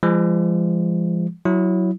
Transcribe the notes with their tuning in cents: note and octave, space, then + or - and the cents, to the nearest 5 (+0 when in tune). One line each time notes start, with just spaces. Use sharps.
F3 -35 G#3 -35
F#3 +0 E4 +0